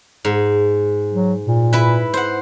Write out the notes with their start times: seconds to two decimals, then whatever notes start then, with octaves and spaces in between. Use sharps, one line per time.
0.25 G#2
1.13 F#3
1.46 A#2
1.73 E4 B4
2.14 C5 F#5